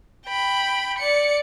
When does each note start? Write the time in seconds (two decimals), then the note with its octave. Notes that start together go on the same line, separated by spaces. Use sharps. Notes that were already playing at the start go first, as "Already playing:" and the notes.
0.26 G5 B5
0.98 D5 C#7